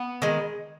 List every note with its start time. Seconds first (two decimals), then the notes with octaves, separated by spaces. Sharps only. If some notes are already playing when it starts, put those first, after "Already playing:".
Already playing: B3
0.22 D#3 G#3